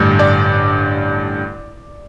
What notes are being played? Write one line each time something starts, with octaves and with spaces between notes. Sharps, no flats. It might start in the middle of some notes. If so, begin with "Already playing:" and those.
Already playing: A1 G2 D3 G3
D5